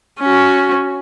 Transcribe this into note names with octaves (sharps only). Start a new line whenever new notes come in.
C#4 F#4